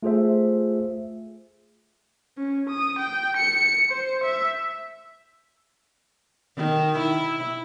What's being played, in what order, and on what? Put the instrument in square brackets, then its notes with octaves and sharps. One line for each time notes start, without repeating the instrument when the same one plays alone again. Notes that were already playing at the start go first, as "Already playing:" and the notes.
[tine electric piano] A3 F4 G#4 C5 E5
[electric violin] C#4
D#6
G5
C#7
C5
E5
[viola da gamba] D#3
E4